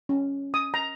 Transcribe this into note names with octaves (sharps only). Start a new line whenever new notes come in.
C#4
D#6
A#5